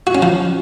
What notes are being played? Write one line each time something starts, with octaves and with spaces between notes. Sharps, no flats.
F#4
C#4
F3